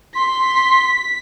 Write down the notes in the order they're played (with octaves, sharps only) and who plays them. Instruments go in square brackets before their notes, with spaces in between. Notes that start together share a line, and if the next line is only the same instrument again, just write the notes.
[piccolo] C6 [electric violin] B6